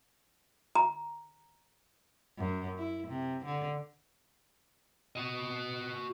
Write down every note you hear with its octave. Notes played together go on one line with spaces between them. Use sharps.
A#5
F#2
E4
C3
D3
F#4 D#5